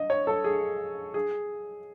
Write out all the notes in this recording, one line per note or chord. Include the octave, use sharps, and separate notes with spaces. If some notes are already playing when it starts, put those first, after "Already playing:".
Already playing: D#5
C#5
A4
G#4
G#4